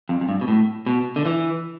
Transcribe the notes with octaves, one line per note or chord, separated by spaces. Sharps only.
F2
F2
G2
B2
A2
B2
D3
E3